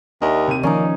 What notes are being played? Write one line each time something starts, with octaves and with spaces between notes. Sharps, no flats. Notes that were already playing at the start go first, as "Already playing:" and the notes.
D#2 D4 D#5 E5
C3 D#7
D#3 F3 A#3 C#4 D#4 D5